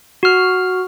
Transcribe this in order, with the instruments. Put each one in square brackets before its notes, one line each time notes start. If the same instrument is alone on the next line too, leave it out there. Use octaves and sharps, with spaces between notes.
[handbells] F#4 F6